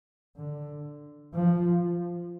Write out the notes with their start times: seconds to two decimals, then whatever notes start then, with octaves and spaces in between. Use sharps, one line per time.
0.37 D3
1.34 F3